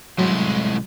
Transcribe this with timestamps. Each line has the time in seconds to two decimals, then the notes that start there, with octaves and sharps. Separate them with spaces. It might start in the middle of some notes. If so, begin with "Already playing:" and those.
0.19 C2 A2 F#3 G#3 C6